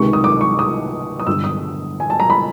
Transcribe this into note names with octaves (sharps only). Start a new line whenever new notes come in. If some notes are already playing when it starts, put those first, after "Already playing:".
Already playing: C#2 C3 D#3 C#6
D#6
D6
C#6
D#6
D#6
G1 G2 D3 E6
D#6
G#5
A5
A#5
B5